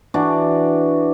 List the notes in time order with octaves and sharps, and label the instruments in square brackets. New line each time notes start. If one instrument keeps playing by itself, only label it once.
[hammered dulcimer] E3 D4 F#4 D5